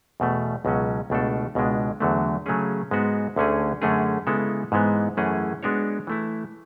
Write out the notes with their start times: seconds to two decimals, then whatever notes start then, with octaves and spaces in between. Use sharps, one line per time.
0.20 E2 B2 A3
0.65 C#2 B2 F#3 C#4
1.10 C#2 B2 A3 D4 A4
1.55 C#2 B2 G#3 D4
2.00 E2 D3 F#3 A3
2.46 C#3 F#3 A3 C#4 G#4
2.91 G#2 G#3 B3 F#4
3.36 D2 D3 A3 C#4 G#4
3.82 F#2 D3 A3 C#4 G#4
4.27 C#3 G#3 B3 E4 A4
4.72 G#2 E3 G#3 B3
5.17 F#2 E3 A3 C#4 G#4
5.63 G#3 B3 D4 F#4 C#5
6.07 E3 A3 E4